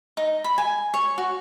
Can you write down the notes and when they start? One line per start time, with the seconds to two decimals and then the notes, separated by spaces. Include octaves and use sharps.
0.17 D#4
0.44 B5
0.58 G#5
0.94 C#5
1.18 F#4